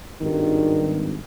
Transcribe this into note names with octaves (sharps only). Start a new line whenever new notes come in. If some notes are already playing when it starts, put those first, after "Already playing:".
G#1 G2 D#3